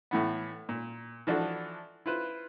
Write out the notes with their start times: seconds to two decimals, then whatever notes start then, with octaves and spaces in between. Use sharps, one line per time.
0.11 A2 E3 B3
0.69 A#2
1.27 E3 F3 D4 F#4 A4
2.06 E4 F4 B4 C5